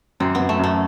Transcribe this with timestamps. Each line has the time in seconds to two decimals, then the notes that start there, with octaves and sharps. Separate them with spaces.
0.20 F#2 C4
0.35 F#2 B3
0.49 A3
0.59 F#2 A3